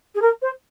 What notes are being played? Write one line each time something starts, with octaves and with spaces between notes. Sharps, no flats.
G#4
A#4
C5